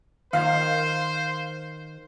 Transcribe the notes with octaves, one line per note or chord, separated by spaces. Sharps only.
D#3 C5 F5